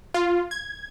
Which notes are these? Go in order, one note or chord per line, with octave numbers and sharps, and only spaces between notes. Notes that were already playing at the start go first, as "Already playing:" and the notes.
F4
G#6